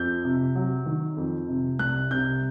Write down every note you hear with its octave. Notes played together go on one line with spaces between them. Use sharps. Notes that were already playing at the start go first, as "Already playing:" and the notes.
Already playing: F2 G6
C3
F#3
D#3
F2
C3
C2 F#6
C3 G6